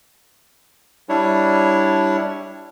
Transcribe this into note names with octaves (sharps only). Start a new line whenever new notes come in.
G3 D4 E4 C#5